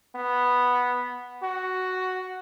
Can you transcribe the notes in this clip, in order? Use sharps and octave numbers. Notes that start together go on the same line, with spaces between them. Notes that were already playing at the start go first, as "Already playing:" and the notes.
B3
F#4